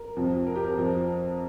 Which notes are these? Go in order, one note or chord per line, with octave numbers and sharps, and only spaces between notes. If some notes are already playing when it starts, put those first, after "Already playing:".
Already playing: A#4
F2 C3 F3
A#4
G4
A#4
F2 F3